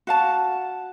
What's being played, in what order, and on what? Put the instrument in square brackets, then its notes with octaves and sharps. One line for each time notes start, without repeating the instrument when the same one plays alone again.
[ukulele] F#4 F5 A5